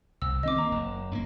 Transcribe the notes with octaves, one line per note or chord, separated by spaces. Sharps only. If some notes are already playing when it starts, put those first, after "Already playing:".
C2 E6
D#3 C4 D#5 D6
A#3 A#5
F#1
F#2 G3 A#3